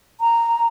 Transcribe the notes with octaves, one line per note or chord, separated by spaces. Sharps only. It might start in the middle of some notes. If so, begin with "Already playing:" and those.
A#5